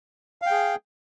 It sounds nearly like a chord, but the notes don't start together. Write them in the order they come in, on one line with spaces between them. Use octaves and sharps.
F5 G5 G#4